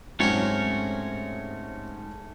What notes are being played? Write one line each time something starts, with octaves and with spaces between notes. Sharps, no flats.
G#2 C3 F#3 A3 C#4 A#4 C#5